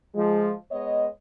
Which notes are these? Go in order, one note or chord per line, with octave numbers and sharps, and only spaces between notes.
F3 G#3
G#3 B3 C#5 D#5